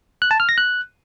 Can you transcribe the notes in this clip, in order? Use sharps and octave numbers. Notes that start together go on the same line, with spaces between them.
F#6
A5
F6
A#6
F#6